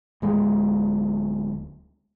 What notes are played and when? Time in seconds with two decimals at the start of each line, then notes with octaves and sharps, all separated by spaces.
0.22 D1 G#3